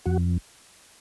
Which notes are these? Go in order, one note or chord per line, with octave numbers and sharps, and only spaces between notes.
F2 F#4